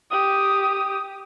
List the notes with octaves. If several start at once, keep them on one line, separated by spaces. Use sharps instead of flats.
G4 D#6